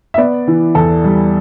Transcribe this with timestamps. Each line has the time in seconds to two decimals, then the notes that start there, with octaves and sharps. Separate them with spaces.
0.14 E5
0.17 B3 D5
0.47 E3
0.75 E2 A4
1.04 G3